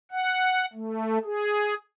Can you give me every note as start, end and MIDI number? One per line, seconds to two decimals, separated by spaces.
0.11 0.66 78
0.73 1.18 57
1.25 1.75 68